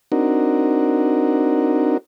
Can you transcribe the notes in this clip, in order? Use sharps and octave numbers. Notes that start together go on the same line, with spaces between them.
C4 D4 D#4 F#4 A#4